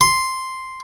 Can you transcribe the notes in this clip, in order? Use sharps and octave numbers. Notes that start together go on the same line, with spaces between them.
C6